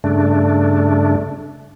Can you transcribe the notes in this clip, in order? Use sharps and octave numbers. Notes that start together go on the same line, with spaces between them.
G2 C#3 A3 D4